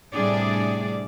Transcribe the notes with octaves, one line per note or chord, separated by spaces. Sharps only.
A2 C3 G3 D4 G#4 D5